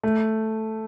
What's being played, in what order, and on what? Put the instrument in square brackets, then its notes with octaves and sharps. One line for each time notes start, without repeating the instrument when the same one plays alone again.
[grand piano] A3